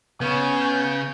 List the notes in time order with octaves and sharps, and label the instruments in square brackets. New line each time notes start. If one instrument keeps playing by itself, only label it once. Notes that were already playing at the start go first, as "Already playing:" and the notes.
[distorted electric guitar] C#3 [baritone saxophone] B3 [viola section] C#4 G#5 [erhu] G6